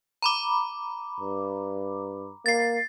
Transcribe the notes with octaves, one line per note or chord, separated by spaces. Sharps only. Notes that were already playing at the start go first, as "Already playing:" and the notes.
A#5 B5 D6
G2
A#3 A6 C7